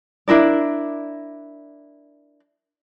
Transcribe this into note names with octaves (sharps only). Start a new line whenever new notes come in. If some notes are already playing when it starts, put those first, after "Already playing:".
D4 E4 A#4 D5